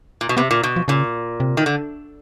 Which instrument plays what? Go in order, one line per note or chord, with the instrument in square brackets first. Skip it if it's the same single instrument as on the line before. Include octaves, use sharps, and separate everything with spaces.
[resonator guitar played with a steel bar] A#2
B2
[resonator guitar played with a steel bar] C3 [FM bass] B3
[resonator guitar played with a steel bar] A#2
B2
[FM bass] F3
[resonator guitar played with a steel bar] A#2 [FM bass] C#3
[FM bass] C3
[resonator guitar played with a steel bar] D#3
D3